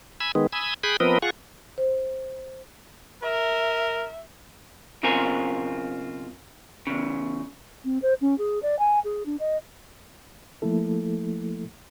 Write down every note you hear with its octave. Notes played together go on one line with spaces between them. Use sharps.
G#5 B5 E6
D#3 G#3 B3
G#5 B5 D#6 E6
G#4 G5 G#5 B5 F#6
F3 B3 C4 A#4 B4 D#5
F4 G#4 F#5 C#6
C5
A#4 E5
B1 C#3 C4 F4 A#4 G#5
E2 C#3
C4
C5
C#4
G#4
D5
G#5
G#4
D4
D#5
F3 A3 A#3 E4 A4